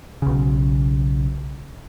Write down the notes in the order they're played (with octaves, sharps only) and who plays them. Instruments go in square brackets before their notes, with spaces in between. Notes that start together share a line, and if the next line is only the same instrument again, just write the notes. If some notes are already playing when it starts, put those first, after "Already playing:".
[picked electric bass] B1 C#3